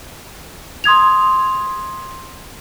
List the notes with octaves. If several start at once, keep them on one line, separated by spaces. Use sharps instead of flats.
C6 D#6 G#6 F7